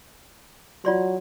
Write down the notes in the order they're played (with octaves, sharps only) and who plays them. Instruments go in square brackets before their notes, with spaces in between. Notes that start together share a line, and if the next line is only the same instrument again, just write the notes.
[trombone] F#3 [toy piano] F4 D5 C6